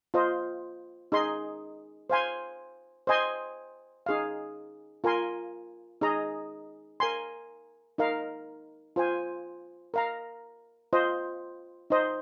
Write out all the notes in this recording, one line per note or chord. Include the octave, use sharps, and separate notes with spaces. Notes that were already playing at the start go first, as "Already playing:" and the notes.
F4 C5 D#5
D#4 G#4 D#5 C6
C5 F5 G#5 C6
C5 D#5 G#5 C6
D#4 G#4 F5
F4 A#4 G#5 C6
D#4 G#4 D#5 A#5
A#4 G#5 C6
D#4 A#4 F5
F4 C5 G#5
A#4 F5 A#5
F4 C5 D#5
D#4 C5 D#5